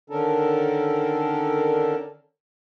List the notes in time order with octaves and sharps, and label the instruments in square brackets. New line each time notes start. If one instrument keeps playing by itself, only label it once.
[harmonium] D3 D#3 C#4 D4 A4 A#4